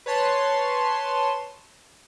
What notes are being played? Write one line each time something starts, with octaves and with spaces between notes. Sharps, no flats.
B4 C#5 A5 C6